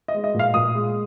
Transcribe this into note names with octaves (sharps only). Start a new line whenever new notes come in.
D#5
G#3
D#5
A#2
F5
A#2 D#6
G#3